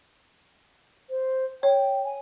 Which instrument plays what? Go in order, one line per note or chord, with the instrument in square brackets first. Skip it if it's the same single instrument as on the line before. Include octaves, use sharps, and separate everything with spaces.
[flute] C5
[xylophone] C#5 [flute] G5
[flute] G#5